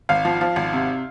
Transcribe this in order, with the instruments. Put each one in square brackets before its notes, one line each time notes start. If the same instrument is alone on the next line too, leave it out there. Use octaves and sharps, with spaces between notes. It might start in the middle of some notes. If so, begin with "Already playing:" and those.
[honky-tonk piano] G#1 F5
F3
F3
G#1
C3